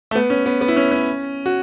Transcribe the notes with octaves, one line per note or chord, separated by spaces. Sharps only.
A3
B3
C#4
B3
B3
E4
C#4
C#4
F#4